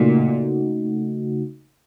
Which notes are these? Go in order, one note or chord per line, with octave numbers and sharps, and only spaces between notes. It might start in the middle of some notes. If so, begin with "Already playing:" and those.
Already playing: A#2 C#3 A3 D#4 F#4